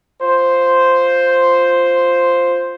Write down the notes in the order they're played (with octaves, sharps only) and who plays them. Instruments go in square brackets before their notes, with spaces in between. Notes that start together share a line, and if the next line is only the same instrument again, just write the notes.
[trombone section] F4 C5